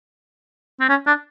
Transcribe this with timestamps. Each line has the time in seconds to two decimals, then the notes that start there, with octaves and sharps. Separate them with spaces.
0.80 C4
0.89 C#4
1.07 D4